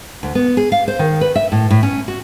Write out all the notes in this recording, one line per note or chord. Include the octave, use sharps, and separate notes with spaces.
D2
B3
G#4
F5
C5
D#3
B4
E5
A2
A2
C#4
F#4